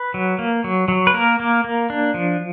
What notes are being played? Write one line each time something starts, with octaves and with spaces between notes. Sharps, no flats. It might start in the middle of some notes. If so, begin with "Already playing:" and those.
Already playing: B4
F#3
A#3
F#3
F#3
B4
A#3 A#4
A#3
A#3
D4
F3